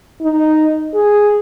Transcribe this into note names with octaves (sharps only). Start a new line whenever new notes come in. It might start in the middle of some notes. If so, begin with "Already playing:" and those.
D#4
G#4